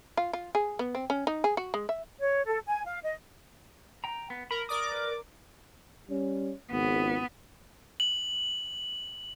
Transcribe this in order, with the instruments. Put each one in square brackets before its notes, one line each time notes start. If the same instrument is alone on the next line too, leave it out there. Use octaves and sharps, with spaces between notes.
[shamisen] F4
F4
G#4
B3
C4
C#4
D#4
G#4
F#4
G#3
E5
[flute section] C#5
A4
G#5
F5
D#5
[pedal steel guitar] G5 A#5
B3
[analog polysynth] A#4 [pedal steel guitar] B5
[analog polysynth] A#4 D5 D6 [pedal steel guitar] D#6
[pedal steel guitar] B4
[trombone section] G3 C#4
[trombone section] G#1 C#2 [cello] B3
[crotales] F#7